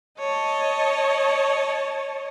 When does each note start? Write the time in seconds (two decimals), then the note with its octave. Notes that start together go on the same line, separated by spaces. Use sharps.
0.18 C#5 D#5 A5